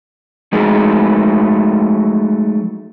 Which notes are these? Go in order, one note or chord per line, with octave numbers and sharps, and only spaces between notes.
F#3 G#3 A3 D#4 G#4